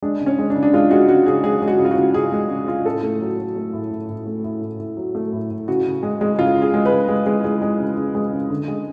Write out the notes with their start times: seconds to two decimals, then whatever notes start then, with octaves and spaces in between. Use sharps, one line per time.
0.02 G#3 D4
0.21 C#3
0.26 C#4
0.39 G#3
0.50 D4
0.55 C#3
0.63 D4
0.73 G#3 F4
0.91 G#3 F#4
1.08 C#3 F#4
1.26 C#3 G#4
1.44 G#3 G#4
1.62 G#3
1.68 F#4
1.79 C#3
1.84 F4
1.91 F#4
1.97 C#3
2.14 C#3 G#4
2.32 G#3
2.50 C#3
2.67 C#3 F4
2.85 A2 A4
3.03 A3
3.21 F#3
3.39 F#3
3.56 A3
3.73 A2
3.91 A2
4.09 A2
4.27 A3
4.44 A2
4.62 A2
4.80 A2
4.97 F#3
5.15 A3
5.33 A2
5.50 A2
5.68 C#3 F#4
5.86 C#3
6.03 G#3
6.21 G#3
6.38 C#3 F4
6.56 C#3
6.62 G#4
6.74 G#3
6.85 B4
6.91 C#3
7.09 G#3
7.26 G#3
7.44 G#3
7.62 G#3
7.80 C#3
7.97 C#3
8.15 G#3
8.33 C#3
8.50 D3
8.68 G#3